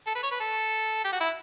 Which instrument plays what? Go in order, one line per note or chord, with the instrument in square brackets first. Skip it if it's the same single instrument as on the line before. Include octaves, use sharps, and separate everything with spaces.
[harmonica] A4
B4
C#5
B4
A4
G4
F#4
E4